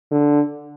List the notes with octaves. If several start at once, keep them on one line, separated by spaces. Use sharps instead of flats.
D3